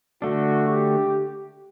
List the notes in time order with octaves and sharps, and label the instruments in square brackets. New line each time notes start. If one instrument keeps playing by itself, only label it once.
[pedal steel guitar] D3 A3 D4 [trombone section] F#4
[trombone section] G4